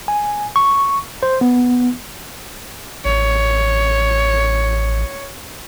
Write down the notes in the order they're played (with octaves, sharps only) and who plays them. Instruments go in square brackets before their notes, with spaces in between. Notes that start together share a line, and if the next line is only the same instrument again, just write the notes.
[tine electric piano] G#5
C#6
C5
B3
[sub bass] A1 [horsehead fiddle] C#5